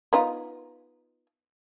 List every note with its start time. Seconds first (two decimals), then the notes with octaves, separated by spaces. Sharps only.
0.13 B3 D#4 F4